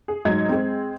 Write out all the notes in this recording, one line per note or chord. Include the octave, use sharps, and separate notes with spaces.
G#4
G#2 F#3 D#4 G#6
G#3 C4